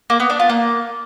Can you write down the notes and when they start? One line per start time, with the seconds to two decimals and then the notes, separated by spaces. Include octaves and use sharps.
0.10 A#3
0.20 B3
0.30 D4
0.40 F4
0.49 A#3